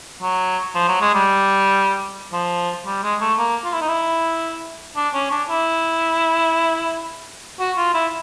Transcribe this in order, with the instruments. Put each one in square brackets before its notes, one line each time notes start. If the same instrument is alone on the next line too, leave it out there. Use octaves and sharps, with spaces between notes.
[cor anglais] F#3
F3
F#3
G#3
G3
F3
G3
G#3
A3
A#3
F4
E4
D#4
E4
D4
C#4
D4
E4
F#4
F4
E4